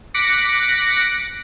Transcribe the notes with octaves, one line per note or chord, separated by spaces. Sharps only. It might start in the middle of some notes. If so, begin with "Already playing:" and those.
D6 F#6 A#6 B6 C#7 D7